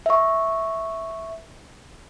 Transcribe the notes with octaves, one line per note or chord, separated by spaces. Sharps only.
E5 C#6